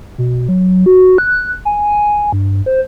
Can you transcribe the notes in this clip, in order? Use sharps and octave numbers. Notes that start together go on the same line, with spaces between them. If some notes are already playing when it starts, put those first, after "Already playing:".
B2
F#3
F#4
F#6
G#5
G2
C5